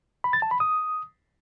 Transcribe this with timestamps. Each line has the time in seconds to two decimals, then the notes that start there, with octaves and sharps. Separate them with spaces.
0.24 B5
0.33 A6
0.42 A5
0.51 B5
0.60 D#6